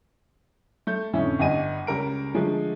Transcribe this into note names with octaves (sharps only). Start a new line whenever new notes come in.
A3 G6
F2 A2 D3 C#4 E4
G1 G2 D#5 G#5 D#7
C#2 G3 A#4 D7
D3 F3 G#3 A3